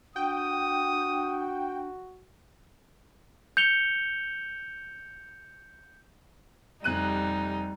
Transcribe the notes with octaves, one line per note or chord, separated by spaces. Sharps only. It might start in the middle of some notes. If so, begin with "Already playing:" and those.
D4 F#4 G5 D#6
G6 C#7 F7 G7
F1 G3 D#4 F#6 D#7